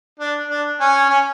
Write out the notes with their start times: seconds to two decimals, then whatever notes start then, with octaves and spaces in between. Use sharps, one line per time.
0.20 D4
0.50 D4
0.80 C#4
1.10 C#4